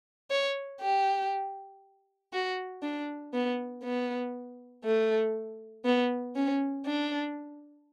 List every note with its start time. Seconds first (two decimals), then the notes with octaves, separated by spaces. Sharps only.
0.31 C#5
0.81 G4
2.33 F#4
2.82 D4
3.33 B3
3.84 B3
4.84 A3
5.85 B3
6.35 C#4
6.85 D4